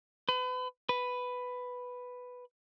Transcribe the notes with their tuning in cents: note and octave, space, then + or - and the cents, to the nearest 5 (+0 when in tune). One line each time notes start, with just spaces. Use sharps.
B4 +35
B4 +5